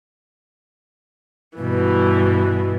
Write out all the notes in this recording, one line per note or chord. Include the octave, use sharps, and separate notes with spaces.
G2 B2 E3